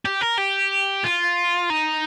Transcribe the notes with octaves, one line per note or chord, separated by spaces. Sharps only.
G4
A#4
G4
F4
D#4